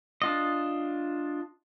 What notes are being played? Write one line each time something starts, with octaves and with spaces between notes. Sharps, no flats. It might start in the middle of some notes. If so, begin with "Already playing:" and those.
D4 F4 D#5